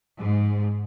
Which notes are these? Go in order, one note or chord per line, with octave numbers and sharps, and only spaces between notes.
G#2